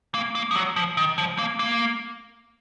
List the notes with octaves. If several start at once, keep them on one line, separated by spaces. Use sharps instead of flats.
A#3
A#3
F3
F#3
F3
D#3
F3
A#3
A#3